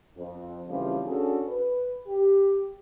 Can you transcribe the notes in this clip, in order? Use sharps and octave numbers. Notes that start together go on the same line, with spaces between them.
F2
C#3 E3 F3 G3 A3 C4
C#4 D4 F#4 G#4 A4
B4
G4